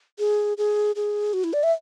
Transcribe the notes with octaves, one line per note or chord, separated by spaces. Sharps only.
G#4
G#4
G#4
F#4
E4
D5
E5